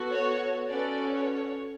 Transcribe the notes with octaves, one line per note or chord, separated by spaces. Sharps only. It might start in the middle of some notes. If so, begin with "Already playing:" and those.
Already playing: B3 F#4 A4
C#5
C#4 F#4 A4 B4 D5
C#5